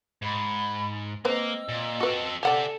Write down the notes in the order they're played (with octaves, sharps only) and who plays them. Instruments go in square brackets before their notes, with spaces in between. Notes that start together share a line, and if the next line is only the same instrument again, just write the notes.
[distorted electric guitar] G#2 [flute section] B5
[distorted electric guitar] A#3 [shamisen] C4 B4 C5 [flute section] D#5 E6
[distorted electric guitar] A#2
[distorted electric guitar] C4 A4 [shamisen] F#4 B4
[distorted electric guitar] G4 E5 [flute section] A4 [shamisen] D5 F#5 G#5